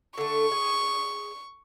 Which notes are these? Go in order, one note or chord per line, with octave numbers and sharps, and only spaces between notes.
D3 A3 C#6
G#4